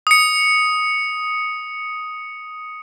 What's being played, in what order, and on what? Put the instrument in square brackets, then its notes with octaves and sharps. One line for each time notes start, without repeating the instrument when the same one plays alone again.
[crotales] D#6 C#7